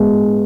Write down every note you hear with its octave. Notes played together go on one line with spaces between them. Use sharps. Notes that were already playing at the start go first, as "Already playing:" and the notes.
Already playing: G#3 B3